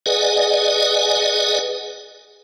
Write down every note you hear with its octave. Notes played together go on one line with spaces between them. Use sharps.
G#4 B4 D5 D#5 F#5 G#5